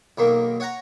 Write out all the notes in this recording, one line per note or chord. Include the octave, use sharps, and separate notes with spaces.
B1 D#3 A#3
C#5 F#5 A#5